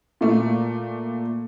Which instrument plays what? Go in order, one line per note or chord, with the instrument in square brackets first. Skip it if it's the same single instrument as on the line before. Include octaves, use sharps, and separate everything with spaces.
[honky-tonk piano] A#2 A3